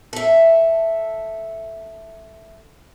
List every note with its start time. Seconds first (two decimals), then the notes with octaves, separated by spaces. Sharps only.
0.13 A4 E5